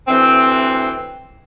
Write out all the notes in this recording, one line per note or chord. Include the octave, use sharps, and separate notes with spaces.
D2 E3 C4